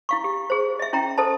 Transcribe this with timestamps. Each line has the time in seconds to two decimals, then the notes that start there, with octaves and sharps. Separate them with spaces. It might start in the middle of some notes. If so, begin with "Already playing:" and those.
0.09 E4 F5 C#6
0.24 G4
0.50 G#4 C5
0.79 D#5 E5
0.93 C#4 E4 G5 A#5
1.18 A4 C5 D#5 A5